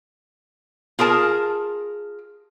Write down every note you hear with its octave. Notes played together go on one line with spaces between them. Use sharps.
F4 G#4 A#4 A5